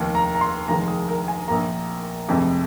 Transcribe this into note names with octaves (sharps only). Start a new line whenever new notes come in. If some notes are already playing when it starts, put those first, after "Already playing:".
Already playing: F1 D#2 D#3
A#5
A#5
C6
F1 D#2 D#3 G#3 A#5
G#4
A#4
G#5
A#1 A#2 A#3 A#5
F1 F2 C3 G#3